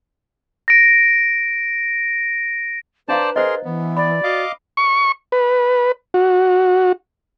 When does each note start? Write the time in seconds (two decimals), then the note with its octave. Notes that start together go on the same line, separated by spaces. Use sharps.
0.68 A#6 D7
3.08 D4 B4 C5 D5 F5 A5 A#5
3.36 G#4 A#4 C5 D#5 C6
3.65 E3 B3
3.97 D5 B5
4.24 F#4 D#5 F5 D6
4.77 C#6
5.32 B4
6.14 F#4